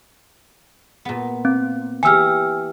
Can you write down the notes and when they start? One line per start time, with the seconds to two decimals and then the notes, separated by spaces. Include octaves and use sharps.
1.05 A#2 B3
1.45 C4
2.03 E3 G4 G#5 E6 F6